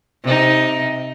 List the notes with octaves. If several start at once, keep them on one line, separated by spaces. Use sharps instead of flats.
C3 D#4